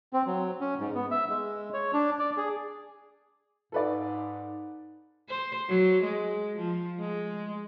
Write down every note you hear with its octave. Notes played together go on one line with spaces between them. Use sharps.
C4
F#3
C#4
G#2
B3
E5
G#3
C#5
D4
D5
G#4
G#2 A4 B4 D5
C5
F#3
G#3
F3
G#3